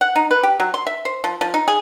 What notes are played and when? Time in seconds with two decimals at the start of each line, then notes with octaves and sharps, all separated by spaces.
0.01 F#5
0.16 D#4
0.31 B4
0.43 G4
0.60 F#3
0.74 C6
0.87 E5
1.05 C5
1.24 F3
1.41 F3
1.54 D#4
1.68 G#4